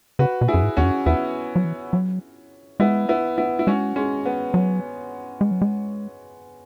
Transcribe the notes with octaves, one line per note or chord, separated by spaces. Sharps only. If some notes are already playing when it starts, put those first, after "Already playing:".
C#3 F#4 B4
B2
E4 G#4
F#2
G#2
E2 C#4 F#4
F#2
E2 B3 E4
F#3
E3
F#3
G#3 B3 E4
B3 E4
B3 E4
E4
G#3 C#4 F#4
G#3 C#4
B3
F#3
G#3
F#3
G#3